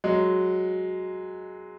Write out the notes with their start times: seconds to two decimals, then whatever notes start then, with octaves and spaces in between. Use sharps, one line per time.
0.04 F#3 G#3